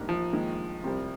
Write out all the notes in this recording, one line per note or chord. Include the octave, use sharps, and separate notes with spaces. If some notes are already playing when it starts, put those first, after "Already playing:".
Already playing: A#1 G#2 G3 A#3 D#4
F3
D#2 D#3 G#3
C2 C3 G3 C4